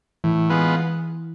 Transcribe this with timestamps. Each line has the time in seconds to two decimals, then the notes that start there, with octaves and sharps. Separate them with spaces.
0.24 A2 E3
0.50 G#3 B3 F4 B4